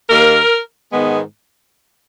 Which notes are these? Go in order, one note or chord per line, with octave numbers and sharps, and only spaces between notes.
D#2 D#3 A#3 A#4
G#2 D#3 G#3 B3